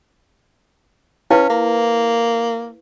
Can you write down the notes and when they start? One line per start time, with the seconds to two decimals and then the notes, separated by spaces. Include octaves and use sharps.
1.31 C#4 E4 B4 F5
1.50 A#3